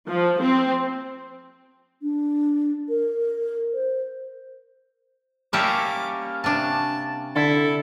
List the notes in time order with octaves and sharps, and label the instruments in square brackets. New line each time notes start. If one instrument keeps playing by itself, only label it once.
[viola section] F3
C4
[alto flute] D4
A#4
C5
[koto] G3 E5 A5 [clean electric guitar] A#3 C#4 A#4 [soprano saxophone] D6
[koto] C3 D4 [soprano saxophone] A5
[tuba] D3 [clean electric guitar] E4 [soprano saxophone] A4